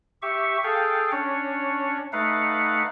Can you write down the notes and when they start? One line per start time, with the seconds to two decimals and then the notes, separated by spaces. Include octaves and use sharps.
0.22 G4 E5 C#6
0.64 G#4 A4 F5 G5
1.12 C#4 D4 C#5
2.13 A3 D#4 B4 F5 F#5